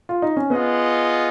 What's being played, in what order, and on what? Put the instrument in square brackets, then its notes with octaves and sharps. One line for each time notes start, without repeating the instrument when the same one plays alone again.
[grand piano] F4
D#4
C#4
[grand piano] B3 [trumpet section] F4 G#4 D#5 F#5